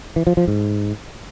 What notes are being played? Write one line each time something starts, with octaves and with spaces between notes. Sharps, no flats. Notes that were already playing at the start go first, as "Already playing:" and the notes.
E3
F3
F3
G#2